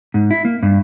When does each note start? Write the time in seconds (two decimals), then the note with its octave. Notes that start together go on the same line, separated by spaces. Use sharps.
0.14 G#2
0.31 E4
0.45 A#3
0.62 G2